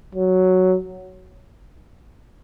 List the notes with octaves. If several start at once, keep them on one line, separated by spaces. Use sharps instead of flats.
F#3